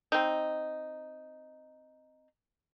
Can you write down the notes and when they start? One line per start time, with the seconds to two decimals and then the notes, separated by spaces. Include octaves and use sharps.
0.12 C4 D#4